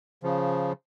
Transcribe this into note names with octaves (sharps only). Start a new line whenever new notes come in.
C#3 F3